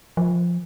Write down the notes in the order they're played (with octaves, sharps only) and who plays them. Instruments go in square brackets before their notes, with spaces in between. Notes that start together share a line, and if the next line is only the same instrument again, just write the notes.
[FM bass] F3